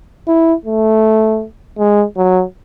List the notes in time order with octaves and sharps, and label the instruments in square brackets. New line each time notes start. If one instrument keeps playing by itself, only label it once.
[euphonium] E4
A3
G#3
F#3